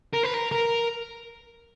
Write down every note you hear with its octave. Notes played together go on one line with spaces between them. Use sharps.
A#4
B4
A#4
A#4